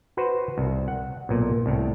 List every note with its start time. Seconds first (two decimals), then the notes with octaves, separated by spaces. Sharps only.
0.17 F#4 B4 C5
0.58 C2
0.88 F#5
1.29 B1 A#2
1.66 C2 A2